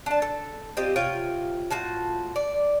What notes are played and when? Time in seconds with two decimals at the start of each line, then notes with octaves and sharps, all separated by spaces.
0.06 D4 A5
0.22 A4
0.77 C4 F4 G4 D#5
0.96 C3 F4 C#5 G5
1.70 A2 F4 F#4 A5
2.36 D5